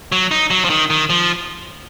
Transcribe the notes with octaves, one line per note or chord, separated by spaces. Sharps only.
F#3
D#4
F#3
F3
D#3
D#3
F3